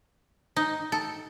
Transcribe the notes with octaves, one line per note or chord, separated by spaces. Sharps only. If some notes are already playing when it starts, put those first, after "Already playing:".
D#4
A4